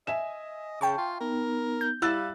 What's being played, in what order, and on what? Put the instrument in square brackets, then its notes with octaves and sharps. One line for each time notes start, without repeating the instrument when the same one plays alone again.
[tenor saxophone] D#5 [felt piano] E5 G#5 E7
[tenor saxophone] C#3 [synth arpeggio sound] G5 A5 C#6
[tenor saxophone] F4
[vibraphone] B3 D#4 [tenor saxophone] A#4
[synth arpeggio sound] G6
[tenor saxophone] G3 [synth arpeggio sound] E4 [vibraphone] F5 [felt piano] E6 F#6 A6